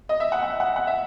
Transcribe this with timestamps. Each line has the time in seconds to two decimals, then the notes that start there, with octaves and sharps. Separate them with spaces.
0.09 D#5
0.20 E5
0.32 F#5
0.43 F#5
0.60 F#5
0.76 F#5
0.87 E5